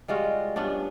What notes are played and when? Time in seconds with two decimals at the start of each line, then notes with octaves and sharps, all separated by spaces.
0.08 G3 G#3 F4 F#4
0.56 G2 B3 C#4 D4